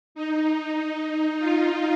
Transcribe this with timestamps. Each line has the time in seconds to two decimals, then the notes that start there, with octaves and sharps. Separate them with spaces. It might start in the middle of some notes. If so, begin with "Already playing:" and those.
0.15 D#4
1.39 F4